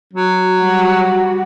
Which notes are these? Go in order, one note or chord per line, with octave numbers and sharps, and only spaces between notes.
F#3
G3 F#4